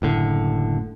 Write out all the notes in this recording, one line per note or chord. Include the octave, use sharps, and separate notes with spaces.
F#1 A2 D3